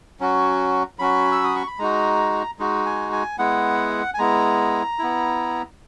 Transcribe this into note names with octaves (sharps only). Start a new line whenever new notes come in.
F#3 C#4 F#4
F#3 C#4 F#4 B5
E6
D#6
C#6
B5
G#3 D#4 F#4 A#5
G#3 D#4 F#4
G#5
G#5
G#3 B3 E4 F#5
G#5
G#3 B3 E4 A#5
B3 E4